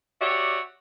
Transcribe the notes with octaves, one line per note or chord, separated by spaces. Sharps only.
F#4 G4 C#5 D5 E5